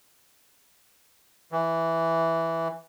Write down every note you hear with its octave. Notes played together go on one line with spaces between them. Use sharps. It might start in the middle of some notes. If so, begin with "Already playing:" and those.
E3